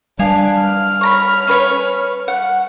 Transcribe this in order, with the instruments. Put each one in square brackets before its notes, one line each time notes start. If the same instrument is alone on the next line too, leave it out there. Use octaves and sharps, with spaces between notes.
[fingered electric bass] G3 [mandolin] B3 F5 G#5 [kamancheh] D4
[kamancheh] F6
[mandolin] C#5 A#5 B5
C#4 B4 C#5
F#5